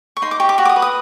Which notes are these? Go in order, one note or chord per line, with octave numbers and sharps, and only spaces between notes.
C#6
D#4 C6
D6
G4 C#6
D6
F#4 C#6
D6
D#6
B4
D#6